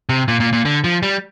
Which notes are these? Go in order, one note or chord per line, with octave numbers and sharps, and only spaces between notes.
C3
A#2
A#2
A#2
D3
F3
G3